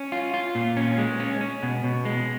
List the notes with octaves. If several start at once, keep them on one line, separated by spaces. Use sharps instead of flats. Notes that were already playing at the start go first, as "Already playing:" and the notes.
Already playing: C#4
F4
F4
A#2
C#4
G#3
C#4
C#4
B2
B2
G#3